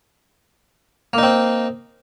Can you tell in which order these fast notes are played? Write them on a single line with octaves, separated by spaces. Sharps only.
A#3 D#4 C4